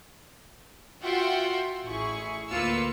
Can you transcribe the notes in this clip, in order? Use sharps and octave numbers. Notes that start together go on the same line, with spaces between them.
F4 F#4 E5 F#5 G5 C6
A1 E4 G#4 C#6
D2 A#3 F4 B4 E6 C#7